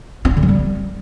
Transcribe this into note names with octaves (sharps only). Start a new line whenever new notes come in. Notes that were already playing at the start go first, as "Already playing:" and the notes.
C4
D4
D3
F#3
G3